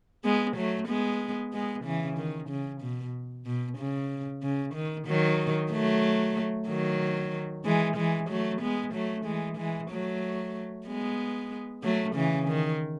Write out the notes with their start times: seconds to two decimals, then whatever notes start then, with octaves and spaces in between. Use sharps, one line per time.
0.24 G#3 B3
0.57 F#3 A3
0.88 G#3 B3
1.53 G#3 B3
1.85 C#3 E3
2.18 D#3
2.49 C#3
2.82 B2
3.46 B2
3.78 C#3
4.43 C#3
4.75 D#3
5.07 D#3 F#3
5.71 F#3 A3
6.68 D#3 F#3
7.65 E3 G#3
7.97 E3 G#3
8.29 F#3 A3
8.61 G#3 B3
8.94 F#3 A3
9.26 E3 G#3
9.58 E3 G#3
9.91 F#3 A3
10.87 G#3 B3
11.83 F#3 A3
12.16 C#3 E3
12.48 D#3